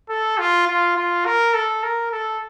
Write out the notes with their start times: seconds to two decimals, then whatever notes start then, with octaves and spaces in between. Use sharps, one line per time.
0.09 A4
0.39 F4
0.68 F4
0.97 F4
1.26 A#4
1.54 A4
1.83 A#4
2.12 A4